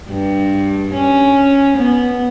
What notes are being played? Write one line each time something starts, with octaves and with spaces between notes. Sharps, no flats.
G2
C#4
B3